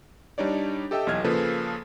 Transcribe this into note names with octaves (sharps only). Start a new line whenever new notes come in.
G3 D4 D#4 C#5 D5
G4 A4 D#5 E5 G5 E6
B1 E2 D#5 F6 G#6
C#3 F3 A#3 G#4 A4 B4